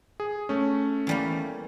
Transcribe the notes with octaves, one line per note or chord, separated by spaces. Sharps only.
G#4
A3 C#4
E2 G3 A#3